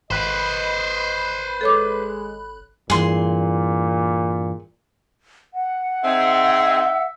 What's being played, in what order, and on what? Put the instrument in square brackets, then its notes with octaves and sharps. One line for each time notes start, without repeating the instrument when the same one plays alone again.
[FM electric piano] G#1 B5 F#6 [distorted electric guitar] B4 C5 [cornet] D#5
[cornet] G#3 [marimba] A4 C#5 D6
[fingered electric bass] G2 E3 [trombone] A#2 [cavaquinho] G#4 C6
[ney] F#5
[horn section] C4 D#4 G#4 [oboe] E5